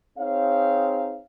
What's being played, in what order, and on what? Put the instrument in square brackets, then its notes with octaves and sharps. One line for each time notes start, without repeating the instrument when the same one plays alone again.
[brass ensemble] C4 D#4 G#4 C#5 F5